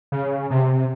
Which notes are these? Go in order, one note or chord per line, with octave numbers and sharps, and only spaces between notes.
C#3
C3